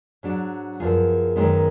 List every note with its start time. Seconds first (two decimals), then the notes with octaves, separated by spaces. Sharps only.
0.23 G#2 F#3 D4
0.80 F#2 F3 B3 F4 G#4
1.36 F#2 D#3 G#3 B3